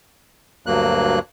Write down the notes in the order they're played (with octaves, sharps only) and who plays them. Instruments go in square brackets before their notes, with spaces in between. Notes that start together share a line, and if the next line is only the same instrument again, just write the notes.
[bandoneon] D2 G2 F#3 A#3 F#6